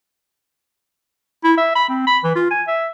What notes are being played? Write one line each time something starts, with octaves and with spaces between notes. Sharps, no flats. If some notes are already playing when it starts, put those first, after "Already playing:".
E4
E5
B5
C4
B5
E3
F4
G#5
E5